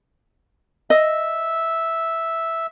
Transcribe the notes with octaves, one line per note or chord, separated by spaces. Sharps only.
D#5 E5